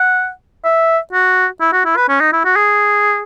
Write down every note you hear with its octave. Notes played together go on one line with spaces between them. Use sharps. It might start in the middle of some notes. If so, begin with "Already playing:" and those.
Already playing: F#5
E5
F#4
E4
F#4
E4
B4
C#4
D#4
E4
F#4
G#4